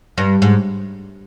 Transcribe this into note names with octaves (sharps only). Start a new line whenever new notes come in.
G2
G#2